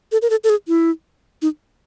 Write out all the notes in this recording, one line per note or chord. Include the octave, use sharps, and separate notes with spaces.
A4
A#4
A4
A4
G#4
E4
D#4